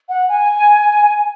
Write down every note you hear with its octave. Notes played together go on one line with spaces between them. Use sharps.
F#5
G#5